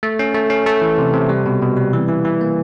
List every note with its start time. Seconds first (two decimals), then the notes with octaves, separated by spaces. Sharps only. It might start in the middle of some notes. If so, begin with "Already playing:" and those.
0.03 A3
0.19 C#4
0.34 A3
0.50 C#4
0.66 A3
0.82 E3
0.98 C3
1.14 C3
1.29 G3
1.46 B2
1.62 B2
1.77 G3
1.94 E3
2.08 E3
2.25 E3
2.41 A#3